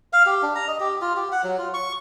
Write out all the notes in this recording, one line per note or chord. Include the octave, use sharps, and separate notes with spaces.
F5
G4
D4
A#5
D#5
G4
F4
G4
F#5
F#3
F4
C#6